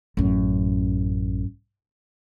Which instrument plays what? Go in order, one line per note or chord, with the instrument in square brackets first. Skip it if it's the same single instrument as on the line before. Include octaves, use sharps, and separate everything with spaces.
[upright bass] A1 F#2